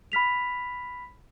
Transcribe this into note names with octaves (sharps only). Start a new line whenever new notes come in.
B5 F6 B6 F7